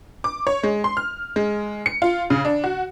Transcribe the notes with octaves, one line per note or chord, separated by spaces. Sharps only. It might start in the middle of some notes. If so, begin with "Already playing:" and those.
D6
C#5
G#3
C6
F6
G#3
C#7
F4
C#3
D4
F#4